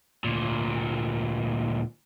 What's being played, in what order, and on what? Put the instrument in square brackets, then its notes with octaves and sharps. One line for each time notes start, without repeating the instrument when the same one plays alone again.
[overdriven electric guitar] D2 A#2